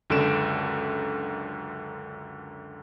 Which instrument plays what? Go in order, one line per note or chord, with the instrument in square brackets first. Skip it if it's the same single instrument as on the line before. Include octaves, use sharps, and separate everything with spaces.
[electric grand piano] C#2 F#2 D3 A4 D7 E7